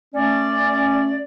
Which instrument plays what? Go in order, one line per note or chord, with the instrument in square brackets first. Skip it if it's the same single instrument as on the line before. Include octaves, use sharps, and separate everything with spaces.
[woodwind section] A3 C#4 D5